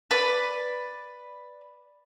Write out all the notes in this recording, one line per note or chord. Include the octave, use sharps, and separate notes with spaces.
B4 D5